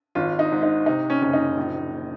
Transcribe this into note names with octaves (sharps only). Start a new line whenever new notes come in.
G#1 F4
D#4
G#2
D#4
C3 D#4
C#4
F#1 C#4
D#4
A#1